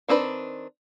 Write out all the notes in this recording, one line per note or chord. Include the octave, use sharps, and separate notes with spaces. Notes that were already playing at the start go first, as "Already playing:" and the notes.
D#3 C4 D4 B4